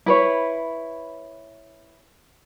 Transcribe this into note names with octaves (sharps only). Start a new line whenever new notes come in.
E4 B4 C#5